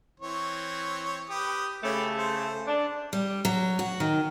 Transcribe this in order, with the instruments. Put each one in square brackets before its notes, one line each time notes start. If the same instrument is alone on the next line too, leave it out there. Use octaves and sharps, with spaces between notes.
[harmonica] E3 C4 C#5
G4 B4 D#6
[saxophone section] C#3 A3 [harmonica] G4 B4
[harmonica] C5
[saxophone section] D4
[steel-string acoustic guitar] G3
F#3
F#4
D#3